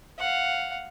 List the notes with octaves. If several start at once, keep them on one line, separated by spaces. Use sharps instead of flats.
F5 F#5